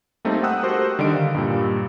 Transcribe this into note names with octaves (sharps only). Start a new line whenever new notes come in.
G3 A3 A#3 C4 D#4
F#5 G5 D#6 E6 F#6
F#4 G4 A4 A#4 C5
D3 D#3 G3 D#5 D7
F5
G2 A#2 G3